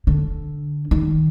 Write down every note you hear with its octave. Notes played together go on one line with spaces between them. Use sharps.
D3
D#3